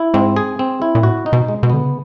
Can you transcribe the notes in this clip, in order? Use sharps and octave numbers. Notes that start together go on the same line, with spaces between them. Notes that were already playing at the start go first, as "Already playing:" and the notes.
Already playing: E4
G#2 C4
G#4
C4
E4
A#2
A2 F#4
D#4
B2
G#3
B2
D3 B3
C#3